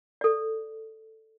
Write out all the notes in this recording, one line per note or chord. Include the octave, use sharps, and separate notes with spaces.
A4 D5